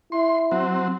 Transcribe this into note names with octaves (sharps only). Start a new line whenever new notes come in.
E4 C6
F#3 C4